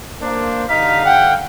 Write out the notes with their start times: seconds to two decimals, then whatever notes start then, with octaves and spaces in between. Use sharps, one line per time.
0.22 A#3 D4 A#4 C5
0.69 G2 D3 D#4 F5 B6
1.05 F#5 G5